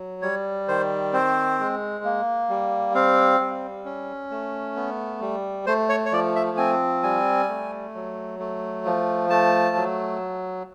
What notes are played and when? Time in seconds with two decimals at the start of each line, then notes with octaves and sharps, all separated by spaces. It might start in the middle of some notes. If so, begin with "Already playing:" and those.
Already playing: F#3
0.22 G3 C#5
0.68 D#3 C5
1.13 C4 C5
1.59 G#3
2.04 A#3
2.49 G3
2.94 C4 F5
3.40 G3
3.85 C#4
4.31 A3
4.76 B3
5.21 G3
5.66 A3 C5
5.89 C#5
6.06 C#5
6.12 F3 D5
6.36 E5
6.57 C4 G#5
7.03 G3 G#5
7.49 A3
7.95 F#3
8.39 A3
8.85 F3
9.30 A3 A5
9.76 F#3